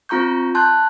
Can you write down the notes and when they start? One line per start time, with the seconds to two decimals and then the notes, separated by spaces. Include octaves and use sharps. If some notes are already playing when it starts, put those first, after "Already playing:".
0.09 C4 F4 A#5 C#6 G6
0.55 A5 C6 F#6 G6